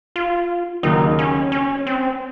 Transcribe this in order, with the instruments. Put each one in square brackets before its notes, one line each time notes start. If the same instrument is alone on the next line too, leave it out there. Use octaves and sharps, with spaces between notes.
[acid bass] F4
[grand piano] D#2 C#3 F#3 A#3 [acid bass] D#4
[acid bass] C#4
C#4
C4